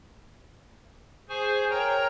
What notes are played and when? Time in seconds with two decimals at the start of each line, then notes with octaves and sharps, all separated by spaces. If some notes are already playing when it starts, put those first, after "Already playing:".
1.29 G#4 C5 G#5 C#6
1.70 A#4 C#5 G5 A#5